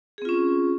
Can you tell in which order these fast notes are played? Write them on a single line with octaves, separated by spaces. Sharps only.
G#4 C4 F4 C#4